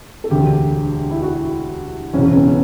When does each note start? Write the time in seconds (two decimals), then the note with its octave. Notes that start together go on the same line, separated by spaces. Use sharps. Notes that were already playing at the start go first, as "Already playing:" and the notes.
0.24 A4
0.30 E1 D2 D3 G4
1.11 E4
1.22 F#4
2.13 F#1 E2 B2 C#4
2.25 C#4
2.36 B3
2.48 C#4